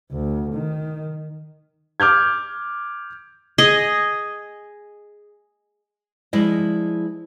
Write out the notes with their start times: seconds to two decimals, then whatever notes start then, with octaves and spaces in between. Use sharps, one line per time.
0.11 D2
0.54 D#3
2.00 D6 F6 G6 G#6
3.58 G#4 D#5
6.33 F3 G#3 E4 D5 D#5